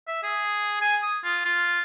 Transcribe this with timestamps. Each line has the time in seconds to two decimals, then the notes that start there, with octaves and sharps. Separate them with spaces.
0.07 E5
0.23 G#4
0.81 G#5
1.02 D#6
1.24 F4
1.45 F4